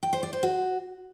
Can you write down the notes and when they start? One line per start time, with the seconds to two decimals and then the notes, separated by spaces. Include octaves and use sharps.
0.03 G5
0.13 C5
0.23 D5
0.33 C5
0.43 F#4